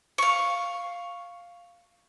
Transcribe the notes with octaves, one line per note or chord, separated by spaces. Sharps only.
F5 C#6